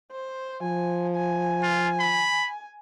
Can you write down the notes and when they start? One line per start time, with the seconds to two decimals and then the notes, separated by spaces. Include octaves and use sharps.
0.11 C5
0.63 F3 G#5
1.15 G#5
1.63 F4
2.00 B5